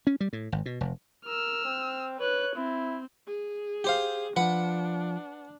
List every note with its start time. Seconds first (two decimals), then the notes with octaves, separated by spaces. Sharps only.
0.07 C#4
0.21 G3
0.33 A2
0.52 G#1
0.66 B2
0.81 F1
1.26 A#4 E6 F6
1.64 C4
2.20 B4 C#5 F#6
2.55 C4 E4
3.27 G#4
3.84 G4 C5 F5
4.36 F3 D4 B4 F#5